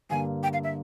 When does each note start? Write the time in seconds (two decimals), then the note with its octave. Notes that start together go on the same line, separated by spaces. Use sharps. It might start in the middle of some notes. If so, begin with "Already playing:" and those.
0.10 G2 D3 G3 A#3 G#5
0.43 G5
0.53 F5
0.64 E5